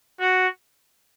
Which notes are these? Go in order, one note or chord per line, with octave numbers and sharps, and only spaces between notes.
F#4